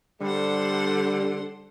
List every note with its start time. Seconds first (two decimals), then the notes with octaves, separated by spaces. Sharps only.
0.21 D3 G3 A4 C5 F#5